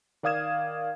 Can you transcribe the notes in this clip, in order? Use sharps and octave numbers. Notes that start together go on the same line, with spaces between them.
D#3 D5 F5 D#6 G#6 E7